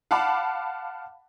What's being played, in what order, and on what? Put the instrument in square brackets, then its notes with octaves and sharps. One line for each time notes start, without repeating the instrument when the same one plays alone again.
[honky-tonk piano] F5 F#5 A5 B5 D6